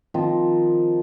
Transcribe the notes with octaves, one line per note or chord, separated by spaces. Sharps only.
D#3 F3 C4 D#5